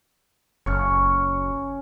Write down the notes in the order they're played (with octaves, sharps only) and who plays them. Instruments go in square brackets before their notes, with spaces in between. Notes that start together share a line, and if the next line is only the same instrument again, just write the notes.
[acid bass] F#1 [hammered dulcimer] C#4 C#5